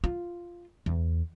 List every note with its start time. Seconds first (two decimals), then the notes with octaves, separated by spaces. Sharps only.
0.04 F4
0.86 E2